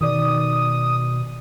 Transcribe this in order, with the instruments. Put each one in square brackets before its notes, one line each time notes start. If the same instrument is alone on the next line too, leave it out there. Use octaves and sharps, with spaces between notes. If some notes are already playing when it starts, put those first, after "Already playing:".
[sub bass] B2 [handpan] D#3 D5 [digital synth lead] D#6